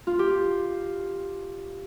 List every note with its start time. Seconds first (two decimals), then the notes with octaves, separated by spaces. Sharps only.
0.07 F4
0.19 G4